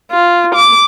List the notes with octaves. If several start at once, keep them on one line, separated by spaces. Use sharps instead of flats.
F4
D6